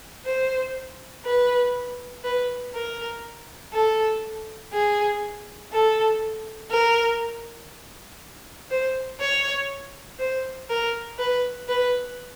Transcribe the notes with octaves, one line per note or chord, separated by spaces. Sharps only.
C5
B4
B4
A#4
A4
G#4
A4
A#4
C5
C#5
C5
A#4
B4
B4